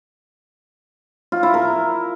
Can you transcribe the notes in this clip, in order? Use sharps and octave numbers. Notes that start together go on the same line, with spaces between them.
F4
E4
A#4